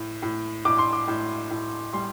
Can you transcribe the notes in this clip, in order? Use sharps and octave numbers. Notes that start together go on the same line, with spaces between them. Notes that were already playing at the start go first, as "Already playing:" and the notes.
Already playing: A2
A2
A2 D6
C6
D6
A2
A2
G3 C6